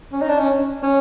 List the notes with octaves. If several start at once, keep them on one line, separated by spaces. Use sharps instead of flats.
C#4
D#4
D4
C#4
C#4